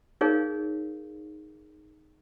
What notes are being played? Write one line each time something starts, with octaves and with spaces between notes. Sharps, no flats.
D#4 G#4 A#4 C#5 F5